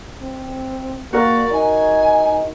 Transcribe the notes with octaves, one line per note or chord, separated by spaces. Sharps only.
C4
A#3 F#4 A#4 D5
D#4 G#5